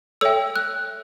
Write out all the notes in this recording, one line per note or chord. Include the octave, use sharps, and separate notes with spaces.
A4 C#5 E5 G5 E6
F#6